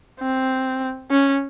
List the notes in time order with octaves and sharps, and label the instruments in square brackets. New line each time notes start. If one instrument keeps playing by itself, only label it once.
[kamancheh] C4
C#4